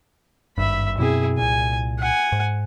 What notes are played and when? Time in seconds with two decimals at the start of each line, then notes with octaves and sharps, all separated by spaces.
0.58 G#1 G2 E5 B5
0.98 F#2 B2 C4 E4 G#4
1.38 C2 A#2 G#5
1.99 F#5 G#5
2.32 G#2